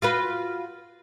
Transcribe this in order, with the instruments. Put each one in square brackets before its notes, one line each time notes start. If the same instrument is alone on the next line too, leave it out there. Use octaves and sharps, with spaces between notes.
[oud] F4 F#4 B4